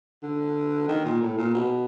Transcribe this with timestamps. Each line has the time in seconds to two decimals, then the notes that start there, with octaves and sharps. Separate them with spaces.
0.23 D3
0.88 D#3
1.05 A#2
1.21 A2
1.38 A#2
1.54 B2